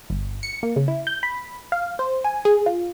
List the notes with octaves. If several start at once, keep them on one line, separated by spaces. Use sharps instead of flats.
G1
C#7
A#3
C#3
E4
G6
B5
F5
C5
G#5
G#4
F4